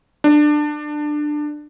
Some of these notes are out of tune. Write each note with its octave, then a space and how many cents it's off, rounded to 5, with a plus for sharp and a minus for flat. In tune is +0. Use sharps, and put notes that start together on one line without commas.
D4 +20